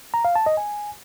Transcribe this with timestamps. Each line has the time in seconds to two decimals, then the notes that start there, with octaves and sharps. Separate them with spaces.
0.14 A#5
0.25 F5
0.36 A5
0.46 D#5
0.57 G#5